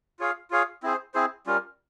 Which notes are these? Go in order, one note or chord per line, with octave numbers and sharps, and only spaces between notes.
F4 G#4 C#5 F5
F4 G#4 C#5 F5
C4 E4 G#4 C5
C4 E4 G#4 C5
G3 C#4 F4 A#4